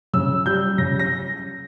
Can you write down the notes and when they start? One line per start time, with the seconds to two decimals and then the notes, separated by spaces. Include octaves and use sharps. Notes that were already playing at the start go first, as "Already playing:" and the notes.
0.13 C#3 E6
0.46 G3 G6
0.78 C#3 A#6
0.99 A#6